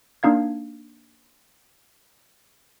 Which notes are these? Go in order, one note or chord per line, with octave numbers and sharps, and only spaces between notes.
A#3 D4 D#4 F5 G#6